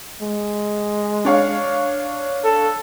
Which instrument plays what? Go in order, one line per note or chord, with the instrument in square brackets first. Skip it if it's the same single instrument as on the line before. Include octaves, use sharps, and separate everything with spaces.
[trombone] G#3
[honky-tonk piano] D4 C#5 F5
[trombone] A4